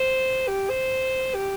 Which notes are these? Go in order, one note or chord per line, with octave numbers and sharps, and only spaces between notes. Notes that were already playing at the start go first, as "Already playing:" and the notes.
Already playing: C5
G4
C5
G4